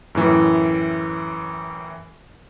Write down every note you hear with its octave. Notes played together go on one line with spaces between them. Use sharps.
F#2 A2 E3